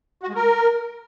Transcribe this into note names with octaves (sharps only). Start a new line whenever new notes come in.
F#4
G#3
A#4